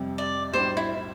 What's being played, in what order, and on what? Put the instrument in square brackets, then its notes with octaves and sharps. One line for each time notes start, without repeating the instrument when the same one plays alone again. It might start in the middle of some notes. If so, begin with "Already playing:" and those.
Already playing: [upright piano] F2 C3 G3
[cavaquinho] D5
[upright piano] B1 A2 G3 D4 [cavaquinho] C5
[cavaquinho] E4